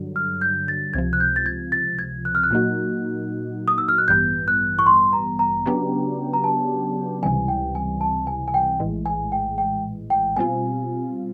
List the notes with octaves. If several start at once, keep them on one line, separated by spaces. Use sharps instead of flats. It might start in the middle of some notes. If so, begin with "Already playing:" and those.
Already playing: G2 D3 F#3
F6
G6
A6
C#2 C3 F3 G#6
F#6
G6
A6
G#6
A6
G#6
F#6
F6
F#6
A#2 F#3 A#3 D#4 F#4
D#6
E6
F6
F#6
A1 G2 E3 G3 B3 G6
F#6
C#6
C6
A#5
A#5
C#3 F#3 B3 D4 G4
A#5
A5
C#2 C3 E3 G3 G#5
G5
G#5
A5
G#5
G#5
G5
A#1 A2 E3 G#3
G#5
G5
G5
G5
B2 G3 C4 F4 G#5